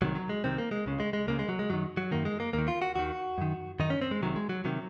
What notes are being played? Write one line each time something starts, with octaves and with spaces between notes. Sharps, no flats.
C2 C3 D#3 F#3
F#3
G#3
C2 C3 D#3 C4
A#3
G#3
C#2 C#3
G#3
G#3
C#2 C#3 A#3
G#3
F#3
G#3
F#2 D#3 F#3
F#3
F#2 D#3 A#3
G#3
A#3
D#2 D#3 A#3
F4
F#4
D#2 D#3 F#4
F#2 D#3
F#2 D#3 D#4
C#4
C4
G#3
C2 C3 D#3 F#3
G#3
F#3
C3 D#3 F#3